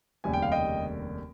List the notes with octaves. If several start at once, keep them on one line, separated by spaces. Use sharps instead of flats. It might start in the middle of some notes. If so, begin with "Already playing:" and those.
F1 D#2 C#3 G3 A#3 G#5
G5
F5
D#5 G5